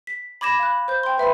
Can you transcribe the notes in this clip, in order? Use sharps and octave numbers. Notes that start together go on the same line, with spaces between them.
B6
B5 D6 G#6 A#6 E7
F5 B5 F#6
C5 G6
G5 C6
B4 E5 B5 C6